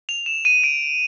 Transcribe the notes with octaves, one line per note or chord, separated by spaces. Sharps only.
F7
E7
D#7
D7